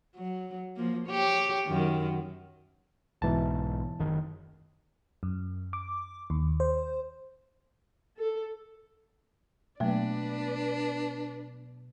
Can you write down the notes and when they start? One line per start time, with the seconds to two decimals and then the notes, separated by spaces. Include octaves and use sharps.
0.16 F#3
0.76 F3 A#3
1.07 G4 C#5
1.67 F#2 D#3
3.22 B1 G#2 B2 E3 A5
3.99 F#1 D#3
5.23 F#2
5.73 D6
6.30 D#2
6.60 C5
8.18 A4
9.80 B2 F#3 A3 A#3 D4 B4 D5